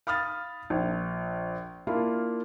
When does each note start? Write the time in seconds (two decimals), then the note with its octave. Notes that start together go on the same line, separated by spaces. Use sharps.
0.07 F5 B5 D#6 F6 A6
0.70 A#1
1.87 A#3 D4 E4 F4